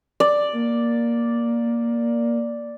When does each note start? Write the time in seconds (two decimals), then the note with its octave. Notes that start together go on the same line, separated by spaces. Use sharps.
0.20 D5
0.53 A#3